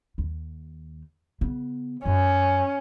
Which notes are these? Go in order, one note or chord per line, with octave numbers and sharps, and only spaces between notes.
D#2
C#3 B3
F#2 C#4